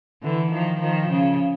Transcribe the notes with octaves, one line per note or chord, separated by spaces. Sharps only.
D3 E3
D#3 F3
D#3 F3
C#3